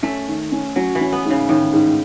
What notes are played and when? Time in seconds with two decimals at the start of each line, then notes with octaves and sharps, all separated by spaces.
0.02 A3 C#4
0.28 D#3
0.52 C#4
0.76 F#3 C#4
0.95 E3
1.00 C#4
1.12 B3
1.25 G#2
1.31 C#3
1.49 A2 D#3
1.73 G#2